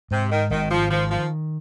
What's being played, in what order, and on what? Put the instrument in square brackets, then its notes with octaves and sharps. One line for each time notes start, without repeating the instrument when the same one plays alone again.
[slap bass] G#2 [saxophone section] C3
[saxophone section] D#3
[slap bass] G#1 [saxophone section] D#3
[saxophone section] F3
[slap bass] D#3 [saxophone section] F3
[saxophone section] F3